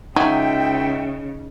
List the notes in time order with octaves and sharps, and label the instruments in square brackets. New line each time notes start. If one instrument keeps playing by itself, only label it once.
[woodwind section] C#2 E5 G5 [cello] C#3 [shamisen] F#3 [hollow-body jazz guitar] D#4